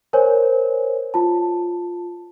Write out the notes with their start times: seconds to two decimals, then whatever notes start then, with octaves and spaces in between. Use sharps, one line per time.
0.13 A#4 C5 C#5 G#5
1.14 F4 A5